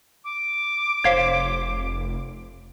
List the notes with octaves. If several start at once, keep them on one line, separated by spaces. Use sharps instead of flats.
D6
F1 C5 C#5 F5 B6